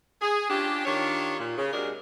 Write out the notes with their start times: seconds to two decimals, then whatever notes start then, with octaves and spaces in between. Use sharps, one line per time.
0.22 G#4
0.50 C#4 D4 F4 G4
0.86 D#3 D4 F4 G4 C#5
1.39 A#2
1.57 C#3
1.73 C3 F#3 G#3 D4 G#4 A#4